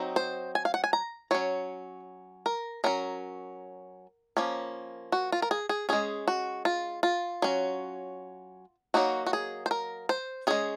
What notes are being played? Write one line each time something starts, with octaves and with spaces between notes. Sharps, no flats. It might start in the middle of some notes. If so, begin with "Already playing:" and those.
Already playing: F#3 C4 D#4
C5
G#5
F5
F#5
G#5
A#5
F#3 C#4 C#5
A#4
F#3 C#4 A#4
F3 A#3 C#4
F#4
F4
A#4
G#4
G#4
G#3 C#4 G#4
F#4
F4
F4
F#3 C#4
F#3 A#3 D#4 F#4
F#4
G#4
C5
A#4
C5
G#3 C#4 G#4